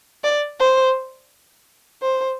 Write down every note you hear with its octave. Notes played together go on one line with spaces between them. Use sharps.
D5
C5
C5